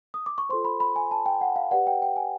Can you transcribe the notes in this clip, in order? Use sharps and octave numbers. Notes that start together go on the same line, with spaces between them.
D#6
D6
C#6
F4 A4 C5 C6
B5
B5
G#5
A5
G5
F#5
F5
G4 B4 D5 F#5
G5
G5
G#5